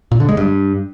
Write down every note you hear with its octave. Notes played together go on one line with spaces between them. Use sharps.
A#2
D3
G#3
G2